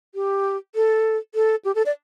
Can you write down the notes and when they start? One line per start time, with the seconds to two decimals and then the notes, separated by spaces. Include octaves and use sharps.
0.15 G4
0.75 A4
1.35 A4
1.65 G4
1.75 A4
1.86 D5